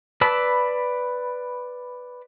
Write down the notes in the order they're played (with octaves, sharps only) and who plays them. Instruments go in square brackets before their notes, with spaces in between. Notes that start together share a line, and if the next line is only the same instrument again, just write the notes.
[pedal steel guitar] B4 D5 A5 B5 E6